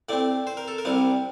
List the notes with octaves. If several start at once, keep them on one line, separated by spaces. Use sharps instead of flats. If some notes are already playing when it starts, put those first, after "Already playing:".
A2 A3 C4 D5
C5
A#4
A4
A#4
C2 C3 G3 C4